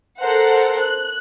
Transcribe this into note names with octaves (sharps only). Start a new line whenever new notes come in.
A4 A#4 C5 F#5
F#6